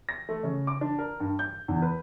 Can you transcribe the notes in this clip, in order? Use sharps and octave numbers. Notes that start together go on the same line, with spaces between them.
A#6
A3
C#3
D6
D4
A#4
G2
G6
E2
B4